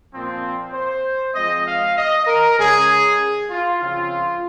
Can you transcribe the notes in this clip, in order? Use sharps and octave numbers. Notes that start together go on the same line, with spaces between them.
A#2 F3 C4
C5
F3 G#3 C4 D#5
F5
D#5
A#4
C#3 G#3 C#4 G#4
F4
C#3 F3 C4 F4